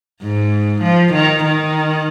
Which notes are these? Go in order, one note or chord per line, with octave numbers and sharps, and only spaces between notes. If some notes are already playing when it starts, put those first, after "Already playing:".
G#2
F3
D#3
D#3